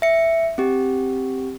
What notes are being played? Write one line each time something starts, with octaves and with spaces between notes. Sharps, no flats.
E5 C#7
C4 G4